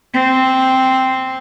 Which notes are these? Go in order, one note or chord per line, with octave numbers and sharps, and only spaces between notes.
C4